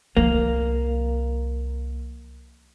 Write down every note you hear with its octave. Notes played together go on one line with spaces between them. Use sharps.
C2 F3 A#3